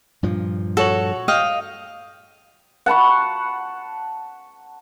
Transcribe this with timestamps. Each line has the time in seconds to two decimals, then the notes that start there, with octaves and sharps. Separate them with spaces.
0.23 G2 A#2 F3
0.77 F#4 A4 C#5 F#7
1.28 D#5 F5 G5
2.86 F#5 A5 B5 C#6